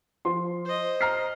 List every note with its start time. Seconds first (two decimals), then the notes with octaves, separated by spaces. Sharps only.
0.25 F3 C6
0.65 C5 D#5
1.01 A#5 F6 C7